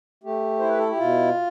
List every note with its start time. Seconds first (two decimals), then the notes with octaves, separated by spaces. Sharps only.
0.24 A3 G4
0.59 E4 C5
0.69 B4
0.78 A4
0.88 G4
0.98 B2 F4